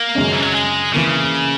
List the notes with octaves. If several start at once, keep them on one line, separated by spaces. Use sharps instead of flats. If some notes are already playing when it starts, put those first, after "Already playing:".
Already playing: A#3
F#2 C#3 G#3 C#4
E3
F#3
G#3
C#3 E3 A#3 E4